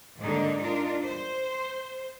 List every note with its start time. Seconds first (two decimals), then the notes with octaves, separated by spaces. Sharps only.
0.21 G#2 D3 A#3 D4 D#4
0.61 D4 D#4 F4 A#4
1.05 C5